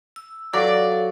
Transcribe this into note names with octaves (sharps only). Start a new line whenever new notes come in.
E6
F#3 A4 D5 F5